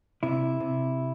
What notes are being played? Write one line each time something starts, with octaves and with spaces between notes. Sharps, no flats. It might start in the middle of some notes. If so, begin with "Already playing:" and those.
C3 E4
C3